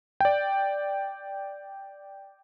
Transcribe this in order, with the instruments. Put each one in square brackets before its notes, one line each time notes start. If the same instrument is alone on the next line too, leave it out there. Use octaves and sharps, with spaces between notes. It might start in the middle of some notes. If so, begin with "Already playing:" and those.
[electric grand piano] D5 G5